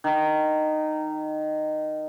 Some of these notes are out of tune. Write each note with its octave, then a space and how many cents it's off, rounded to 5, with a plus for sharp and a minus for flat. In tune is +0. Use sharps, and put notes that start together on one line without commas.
D#3 -15